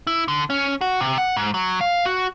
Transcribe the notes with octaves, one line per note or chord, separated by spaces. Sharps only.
E4
D3
C#4
F#4
C3
F#5
G#2
F#3
F5
F#4